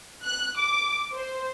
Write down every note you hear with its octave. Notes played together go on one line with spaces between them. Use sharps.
F#6
D6
C5